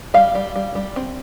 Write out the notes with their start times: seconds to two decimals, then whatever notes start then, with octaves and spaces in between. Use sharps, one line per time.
0.14 G3 F5
0.35 G3
0.56 G3
0.75 G3
0.96 C4